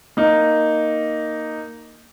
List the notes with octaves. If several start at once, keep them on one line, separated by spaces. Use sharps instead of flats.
A#3 D#4